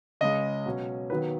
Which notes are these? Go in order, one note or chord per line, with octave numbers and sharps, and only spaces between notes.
C#2 C#3 G#3 D#5
B2 F#3 C#4
D#2 D#3 F#3 B3 B4